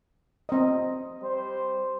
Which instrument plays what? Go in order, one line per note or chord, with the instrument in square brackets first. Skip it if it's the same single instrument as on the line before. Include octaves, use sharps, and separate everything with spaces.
[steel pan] C4 D#5
[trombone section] G3 C5